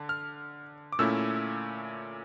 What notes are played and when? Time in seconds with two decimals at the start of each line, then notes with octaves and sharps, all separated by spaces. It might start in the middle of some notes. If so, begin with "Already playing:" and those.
Already playing: D3 A5
0.09 F6
0.93 D6
0.99 A#2 A3 C#4 E4 E6